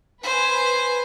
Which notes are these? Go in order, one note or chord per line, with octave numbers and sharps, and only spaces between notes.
B4 C5 G#5